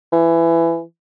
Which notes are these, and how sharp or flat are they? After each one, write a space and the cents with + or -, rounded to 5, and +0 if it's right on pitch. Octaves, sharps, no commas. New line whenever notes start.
E3 +20